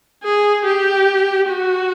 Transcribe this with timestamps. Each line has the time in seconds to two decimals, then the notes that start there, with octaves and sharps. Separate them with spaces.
0.24 G#4
0.65 G4
1.49 F#4